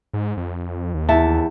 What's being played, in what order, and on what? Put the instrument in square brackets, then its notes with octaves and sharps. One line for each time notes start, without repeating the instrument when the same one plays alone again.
[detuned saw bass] G#2
F2
D#2
[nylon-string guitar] E2 E5 A5